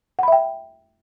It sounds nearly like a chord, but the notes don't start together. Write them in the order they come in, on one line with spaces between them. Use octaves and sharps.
F#5 B5 E5 G5